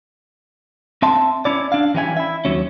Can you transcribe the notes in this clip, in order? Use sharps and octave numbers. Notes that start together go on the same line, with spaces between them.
C4 E5 A5 C6
C#4 E4 D5
D4 F5
E3 G3 C#4 E5 G#5
E4 E5
D#2 F#3 C#4